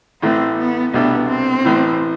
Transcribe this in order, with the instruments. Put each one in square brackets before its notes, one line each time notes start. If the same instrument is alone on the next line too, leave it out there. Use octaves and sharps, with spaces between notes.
[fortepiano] A1 A2 E3 A3 [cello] C4
[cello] B3
[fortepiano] C2 B2 A3 D4 G4 [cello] B3
[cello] C4
[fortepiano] A1 A2 E3